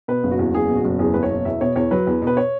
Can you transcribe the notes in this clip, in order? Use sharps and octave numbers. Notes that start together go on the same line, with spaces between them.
B2 B4
F#1
F#4
E2
F#1 G#4
B2
F#4
F#1
E2 G#4
F#1 B4
C#5
B2
E2 E5
B2 C#5
E2 C#5
F#3 B4
E2
B2
B4
C#5